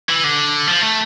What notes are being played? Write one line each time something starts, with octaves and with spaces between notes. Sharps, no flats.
E3
D3
F3
A3